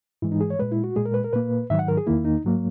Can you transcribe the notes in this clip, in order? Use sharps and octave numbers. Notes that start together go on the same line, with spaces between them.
G#2 E3 G#3 E4
D#4
G#4
C#5
A#2 G#3 B4
E4
F#4
A#2 G#3 G#4
A#4
B4
A#4
A#2 A#3 B4
G#2 D#3 F#3 E5
F#5
A#4
G#4
E2 D#3 A#3 E4
D#4
G#2 F#3 A#3